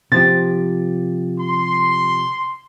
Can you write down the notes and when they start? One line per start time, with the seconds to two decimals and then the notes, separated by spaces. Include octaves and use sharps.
0.12 C3 F3 G4 A6
1.40 C6